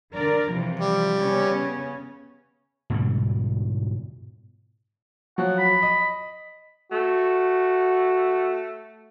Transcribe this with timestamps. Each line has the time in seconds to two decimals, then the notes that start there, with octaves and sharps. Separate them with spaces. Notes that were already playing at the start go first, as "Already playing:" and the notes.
0.13 D3 A#4 D5
0.51 C3 E3 F3
0.80 G3
1.20 C#3 B3 C#4
2.90 G#2 B2 D3 G3
5.38 F3 F#3 F#5
5.58 B5
5.82 D#5
6.92 A3 F#4